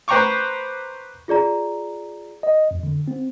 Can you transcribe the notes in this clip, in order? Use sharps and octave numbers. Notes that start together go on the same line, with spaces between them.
B4 C5 G5 A#5 C#6 D6
F4 G#4 D5 A#5
D#5
F2
D3
C4